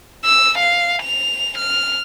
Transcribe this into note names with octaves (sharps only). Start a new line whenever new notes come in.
E6
F5
F7
F6